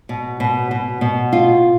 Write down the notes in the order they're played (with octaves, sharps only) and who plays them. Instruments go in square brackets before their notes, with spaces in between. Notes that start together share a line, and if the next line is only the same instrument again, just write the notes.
[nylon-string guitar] B2
B2
B2
B2
F4